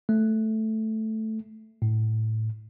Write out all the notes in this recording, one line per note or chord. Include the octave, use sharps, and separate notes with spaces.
A3
A2